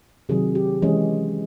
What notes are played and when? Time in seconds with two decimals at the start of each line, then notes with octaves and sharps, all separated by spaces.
0.29 C3 D#3 F#3 G#4
0.55 G4
0.82 E3 G#3 C#4 G#4